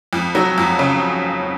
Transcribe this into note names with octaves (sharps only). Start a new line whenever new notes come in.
F2
F#3
F2
C#3